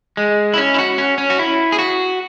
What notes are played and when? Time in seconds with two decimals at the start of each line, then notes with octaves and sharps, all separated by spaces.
0.17 G#3
0.54 E4
0.58 C#4
0.74 E4
0.79 F#4
0.98 C#4
1.18 C#4
1.30 F#4
1.39 E4
1.72 G#4
1.79 F#4